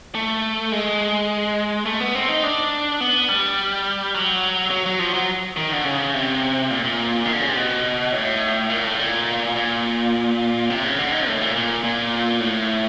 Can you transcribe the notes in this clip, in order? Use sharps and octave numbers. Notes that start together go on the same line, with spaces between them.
A3
G#3
A3
B3
C4
D#4
D4
B3
G3
F#3
F#3
F#3
F3
F#3
D#3
D3
C#3
C3
A#2
A#2
D#3
D3
C#3
C3
B2
A2
A#2
A2
A#2
A#2
C3
C#3
D3
D#3
A2
A#2
A#2
A#2
A2